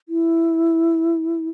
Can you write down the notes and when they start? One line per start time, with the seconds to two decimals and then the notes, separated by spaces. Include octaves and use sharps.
0.09 E4